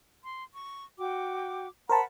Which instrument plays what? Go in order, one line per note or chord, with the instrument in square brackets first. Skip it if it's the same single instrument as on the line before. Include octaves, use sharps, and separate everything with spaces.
[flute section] C6
C#6
F#4 G5 D6
[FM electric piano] A#4 C5 A5 [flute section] F#5 B5